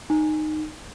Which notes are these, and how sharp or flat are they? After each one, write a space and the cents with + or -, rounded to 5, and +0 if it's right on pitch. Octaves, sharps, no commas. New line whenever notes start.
D#4 -15